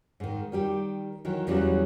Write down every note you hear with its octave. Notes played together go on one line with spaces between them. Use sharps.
G#2 D#3
D#3 G3 G4
D#3 E3 F#3
E2 C#3 E3 F#3 G3